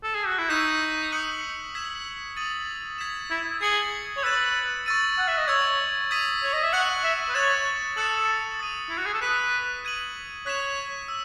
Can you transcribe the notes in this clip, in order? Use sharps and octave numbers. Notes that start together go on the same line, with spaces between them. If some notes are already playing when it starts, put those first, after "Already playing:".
A4
G#4
F#4
E4
D#4 C#6 E6 B6 E7
D#6 F#6 C#7 F#7
E6 G#6 B6 E7
D#6 A6 D#7 F#7
G#6 B6 E7
E4
G#4 G#6 C#7 F#7
C#5
B4 E6 A6 E7
C#6 E6 A6 D#7
F#5
E5
D#5
C#5 C#6 E6 G#6
D#6 G#6 B6 D#7
C#5
D#5
E5
F#5 C#6 F#6 C#7 F#7
E5
B4
C#5 F#6 A6 E7
A4 D#6 F#6 C#7 F#7
D#6 A6 D#7
E4
F#4
G#4
A4
B4 D#6 F#6 B6 E7
G#6 D#7 F#7
C#5 F#6 B6 E7
E6